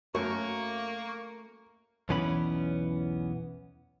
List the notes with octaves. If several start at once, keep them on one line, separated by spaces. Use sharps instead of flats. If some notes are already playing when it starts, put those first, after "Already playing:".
F#2 F#3 A3 A#3 A#4 C#6
B1 E2 E3 B3 C#4 B5